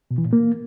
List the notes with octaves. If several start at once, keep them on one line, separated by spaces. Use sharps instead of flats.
B2
E3
A#2
A#3